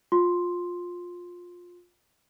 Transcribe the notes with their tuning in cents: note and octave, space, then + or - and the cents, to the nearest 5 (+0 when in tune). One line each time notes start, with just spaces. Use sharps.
F4 +20 C6 +0